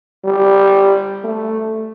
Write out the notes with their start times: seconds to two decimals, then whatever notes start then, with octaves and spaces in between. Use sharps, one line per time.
0.25 G3
1.24 A3